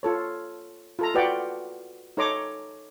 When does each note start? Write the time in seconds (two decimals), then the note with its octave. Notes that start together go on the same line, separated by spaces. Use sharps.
0.03 F4 A4 C#5
0.99 F4 A4 A#5
1.14 F4 F#4 B4 D5 F#5 G5
2.17 D#4 A4 C#5 A#5 C6 D6